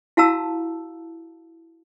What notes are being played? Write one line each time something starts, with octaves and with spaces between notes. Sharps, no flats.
E4 F#4 F5 A5 A#5 E6